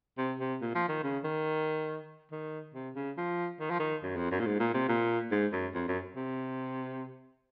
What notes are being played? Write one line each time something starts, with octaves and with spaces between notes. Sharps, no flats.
C3
C3
A#2
F3
D#3
C#3
D#3
D#3
C3
C#3
F3
D#3
F3
D#3
F#2
F2
F#2
A#2
G#2
A#2
C3
A#2
G#2
F#2
F2
F#2
C3